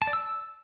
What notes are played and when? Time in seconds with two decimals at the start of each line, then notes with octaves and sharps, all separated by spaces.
0.02 A5
0.07 D5
0.13 E6